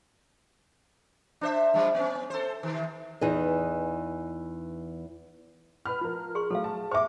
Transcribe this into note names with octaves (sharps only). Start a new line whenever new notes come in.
D4 C5 E5
G2 F3 G3
B3 C#4
A4 C5
C3 D#3
E2 E3 D#4 G#4 B4 D#5
B4 B5 F6
F3 A#4
G#4 C6 C#6
F#3 A3 A4 F5
A5
C5 E5 C#6 D6